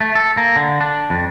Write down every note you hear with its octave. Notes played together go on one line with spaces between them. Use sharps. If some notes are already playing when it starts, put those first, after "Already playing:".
A3
A4
A#3
D3
D4
F2